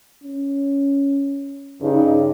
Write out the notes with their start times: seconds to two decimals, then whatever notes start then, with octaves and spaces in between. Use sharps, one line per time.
0.24 C#4
1.81 G2 C#3 D#4